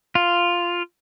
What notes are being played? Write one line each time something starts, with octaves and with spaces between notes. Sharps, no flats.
F4